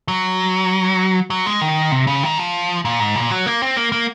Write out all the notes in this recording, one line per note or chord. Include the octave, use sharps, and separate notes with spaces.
F#3
F#3
G#3
D#3
C3
C#3
D#3
F3
A#2
G#2
A#2
F#3
A#3
C4
A#3
A#3